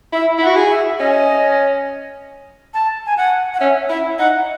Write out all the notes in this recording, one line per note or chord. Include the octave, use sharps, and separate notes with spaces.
E4 E5
E4 F#5
F#4
G#4
E5
C#4 D#5
A5
G#5
F#5
F#5
C#4 E5
E4 E5
D#4 F#5